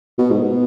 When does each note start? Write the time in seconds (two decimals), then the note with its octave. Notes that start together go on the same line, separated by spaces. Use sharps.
0.18 B2
0.30 G#2
0.42 B2